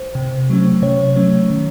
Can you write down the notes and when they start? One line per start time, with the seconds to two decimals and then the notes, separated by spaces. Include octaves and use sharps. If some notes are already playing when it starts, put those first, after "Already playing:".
Already playing: C5
0.15 C3
0.50 F#3 A3 C#4
0.82 C3 C#5
1.16 F#3 A3 C#4
1.50 D#3